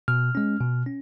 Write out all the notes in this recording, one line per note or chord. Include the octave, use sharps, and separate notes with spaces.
B2 F6
G#3 C#4
B2
C#4